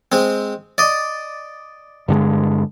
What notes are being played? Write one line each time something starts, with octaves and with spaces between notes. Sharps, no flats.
G#3 C4
D5 D#5
G2 D3 G#3